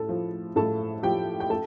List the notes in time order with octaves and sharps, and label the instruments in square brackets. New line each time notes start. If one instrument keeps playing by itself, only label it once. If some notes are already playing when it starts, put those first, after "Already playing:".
Already playing: [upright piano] A2 A4
F3
A2 A4 A5
F3 G4 G5
G5
A4 A5